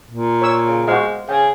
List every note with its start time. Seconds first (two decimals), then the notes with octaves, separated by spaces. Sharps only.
0.11 A#2
0.42 C#5 E6
0.67 C#3
0.87 G#3 F#4 C5 F5
1.29 C#3 G#4 G5